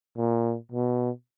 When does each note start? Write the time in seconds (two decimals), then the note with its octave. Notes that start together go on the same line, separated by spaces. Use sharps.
0.17 A#2
0.72 B2